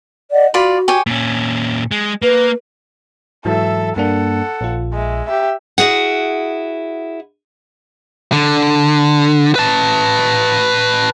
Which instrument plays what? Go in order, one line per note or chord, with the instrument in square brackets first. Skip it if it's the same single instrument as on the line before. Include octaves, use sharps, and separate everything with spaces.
[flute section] D5 D#5 F#5
[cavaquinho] F4 D5 B5 [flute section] F#4
[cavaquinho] G4 C#5 G#5
[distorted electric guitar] A#2 C#4
G#3
[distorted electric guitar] A#3 [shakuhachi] B4
[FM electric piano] G#2 E3 F#3 [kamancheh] A4 E5
[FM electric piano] G2 A#3 D4 [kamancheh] A4 F#5
[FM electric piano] A#1 F4
[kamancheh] G#3 E5
G4 E5
[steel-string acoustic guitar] E4 F#4 G#4 F#5
[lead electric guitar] D3
B4 A5